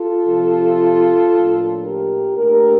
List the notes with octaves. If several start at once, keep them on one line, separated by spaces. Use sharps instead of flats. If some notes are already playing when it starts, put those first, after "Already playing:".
Already playing: F4 A4
C3 F3 C4
A2 F3 A#3 D4
G4 A#4
A#2 A3 D4 G4 A#4